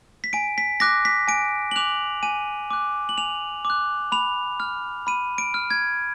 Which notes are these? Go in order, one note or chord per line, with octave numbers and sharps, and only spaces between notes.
B6
G#5 D7
B6
D6 F#6 A#6
B6
G#5 D7
F#7
D6 F#6 F7
G#5 D#7
D6 F#6
F#7
G#5 F7
D6
F#6
B5 F7
F6
B5 D#7
D7
F6
G#6